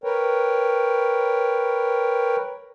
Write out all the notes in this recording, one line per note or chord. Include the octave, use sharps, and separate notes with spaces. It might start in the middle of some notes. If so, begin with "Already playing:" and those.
A#4 B4 C#5 G5